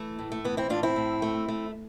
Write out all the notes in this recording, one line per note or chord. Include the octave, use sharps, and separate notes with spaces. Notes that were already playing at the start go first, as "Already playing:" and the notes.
Already playing: E3 A3
A2
A3
E3 B3
C4 E4
A2 D4 F4
C4 E4
A2
A3
A3